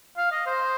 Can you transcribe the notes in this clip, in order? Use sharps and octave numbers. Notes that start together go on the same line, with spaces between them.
F5
D#5
C5